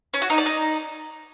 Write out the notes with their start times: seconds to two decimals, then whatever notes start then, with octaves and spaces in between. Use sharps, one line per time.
0.14 C#4
0.22 F#4
0.30 D#4
0.38 D5
0.46 D#4